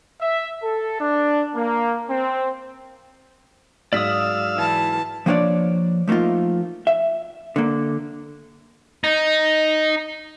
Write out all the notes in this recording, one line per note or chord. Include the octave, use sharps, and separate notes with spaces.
E5
A4
D4
A#3
C4
G#2 F#3 D5 F5 D#6 E6 B6
E3 A5
F3 A#3 B3 D4 C#5 D5
F3 A3 A#3 D#4 F4
E5
D3 A#3
D#4